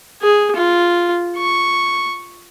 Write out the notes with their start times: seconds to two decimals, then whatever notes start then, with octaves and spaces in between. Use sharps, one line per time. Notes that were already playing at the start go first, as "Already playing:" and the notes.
0.22 G#4
0.56 F4
1.37 C#6